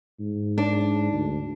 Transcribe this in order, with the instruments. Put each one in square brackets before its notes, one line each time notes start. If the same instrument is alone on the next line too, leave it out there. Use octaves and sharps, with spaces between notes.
[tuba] G#2
[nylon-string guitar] D4
[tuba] D2